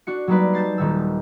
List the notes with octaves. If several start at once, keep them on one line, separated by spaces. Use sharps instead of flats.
D4 F#4 C#7
F#3 G3 A#3 D#4 B4 D5
A5 G6 A6 C7
D#1 D#3 G3 E6